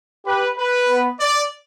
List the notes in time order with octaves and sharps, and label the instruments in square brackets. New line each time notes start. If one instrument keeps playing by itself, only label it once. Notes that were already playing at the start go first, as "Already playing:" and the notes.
[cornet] G4 [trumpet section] B4
[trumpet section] B4
[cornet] B3
[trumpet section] D5